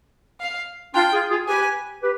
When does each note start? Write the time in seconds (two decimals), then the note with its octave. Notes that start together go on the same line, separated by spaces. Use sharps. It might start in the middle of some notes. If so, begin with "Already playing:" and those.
0.40 F5
0.94 D4 F4 G5
1.12 F4 G#4
1.30 F4 G#4
1.48 G4 B4 G#5
2.02 G4 B4